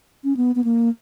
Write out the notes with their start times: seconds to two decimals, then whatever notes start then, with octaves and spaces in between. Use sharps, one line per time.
0.24 C#4
0.37 B3
0.55 B3
0.64 A#3